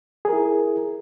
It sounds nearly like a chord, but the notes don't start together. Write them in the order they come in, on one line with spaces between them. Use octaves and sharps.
G#4 A#4 E4